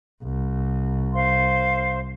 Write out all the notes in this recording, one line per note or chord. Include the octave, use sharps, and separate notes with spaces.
C2
C5 F5 C6